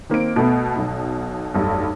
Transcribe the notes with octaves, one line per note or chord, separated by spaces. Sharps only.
D#3 A#3 C4 D7
B2 A3 B3
B1 B2
F1 B1 G2